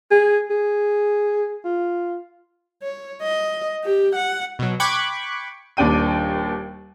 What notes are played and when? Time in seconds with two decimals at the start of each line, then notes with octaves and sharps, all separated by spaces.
0.11 G#4
0.51 G#4
1.64 F4
2.83 C#5
3.22 D#5
3.84 G4
4.15 F#5
4.59 B2 F#3
4.80 G5 B5 C#6 D6 F#6 G#6
5.77 D#1 D#2 D4 G5 D#7